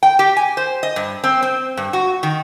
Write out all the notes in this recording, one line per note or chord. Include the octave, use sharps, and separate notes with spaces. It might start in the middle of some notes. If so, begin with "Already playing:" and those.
G5
G4
G#5
C5
D#5
G2
C4
C4
G2
F#4
D#3